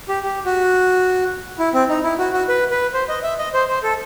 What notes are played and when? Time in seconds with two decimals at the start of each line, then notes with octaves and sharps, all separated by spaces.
0.09 G4
0.23 G4
0.45 F#4
1.59 E4
1.74 C4
1.89 D#4
2.04 E4
2.18 F#4
2.33 F#4
2.49 B4
2.71 B4
2.93 C5
3.09 D#5
3.23 E5
3.38 D#5
3.54 C5
3.68 C5
3.83 A4